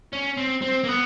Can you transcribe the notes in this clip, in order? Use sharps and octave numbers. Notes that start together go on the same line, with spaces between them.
C#4
C4
C4
A#3
B3